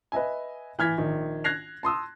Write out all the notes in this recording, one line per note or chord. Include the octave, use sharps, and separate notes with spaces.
B4 D#5 E5 G#5
E3 F6 G#6 B6
A#1 D#3
F#6 G#6 A#6 C7 F7
A5 C6 D#6 E6